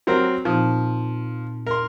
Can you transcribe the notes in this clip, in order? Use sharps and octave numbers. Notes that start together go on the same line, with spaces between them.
F#3 C4 A#4
A#2 F3 C4 D#4
A#4 C6